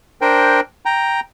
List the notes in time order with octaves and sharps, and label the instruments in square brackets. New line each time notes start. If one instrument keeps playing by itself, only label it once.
[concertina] D4 A#4 C5 G5
G5 A#5